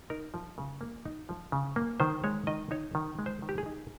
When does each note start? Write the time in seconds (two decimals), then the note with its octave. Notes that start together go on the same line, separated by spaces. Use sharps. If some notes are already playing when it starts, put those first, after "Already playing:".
0.10 D#4 A#4
0.34 F3
0.58 C#3
0.81 A#3
1.05 D#4
1.29 F3
1.52 C#3
1.76 A#3
2.00 D#3 C5
2.24 G#3 C#5
2.47 D#3 D#5
2.71 D#4 C#5
2.95 D#3
3.19 G#3
3.26 C5
3.42 D#3
3.49 G4
3.58 G#4
3.66 D#4